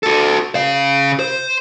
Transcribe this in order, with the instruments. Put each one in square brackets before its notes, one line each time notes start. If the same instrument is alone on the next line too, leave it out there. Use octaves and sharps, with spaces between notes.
[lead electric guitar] F#4 A4
C#3 F5
C5